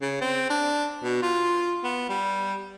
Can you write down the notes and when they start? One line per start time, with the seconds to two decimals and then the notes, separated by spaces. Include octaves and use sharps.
0.01 C#3
0.21 C4
0.50 D4
1.03 B2
1.22 F4
1.84 B3
2.09 G3